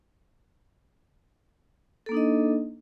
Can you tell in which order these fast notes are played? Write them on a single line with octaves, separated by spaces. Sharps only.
A4 A#3 D4 D#4 D#5